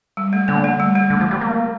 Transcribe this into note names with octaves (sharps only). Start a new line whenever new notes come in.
G3
A3
D3 A#3
A3
G3
A3
D3
F3
G3
A#3